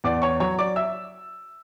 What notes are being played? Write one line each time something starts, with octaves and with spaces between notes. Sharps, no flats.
E2 D5 D6
C#5 C#6
F#3 C#5 C#6
D5 D6
E5 E6